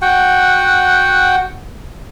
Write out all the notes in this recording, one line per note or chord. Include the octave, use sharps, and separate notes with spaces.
F#4 F#5 G5